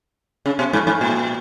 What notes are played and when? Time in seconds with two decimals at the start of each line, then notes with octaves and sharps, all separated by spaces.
0.46 C#3
0.59 B2
0.73 G#2
0.87 G#2
1.01 A#2